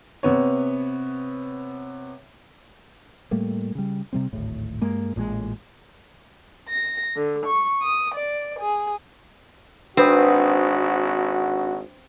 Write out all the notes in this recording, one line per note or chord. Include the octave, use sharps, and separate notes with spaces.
C3 B3 C#5
A2 G3 A3 A#3
C#3 G3
C3 G3 C4
D1 G#1 A2
G2 G#3 A#3
A1 A#2 C#3 G#3
A#6
D3
C#6
D#6
D5
G#4
G#1 C4 D4 F#4 B4 D#6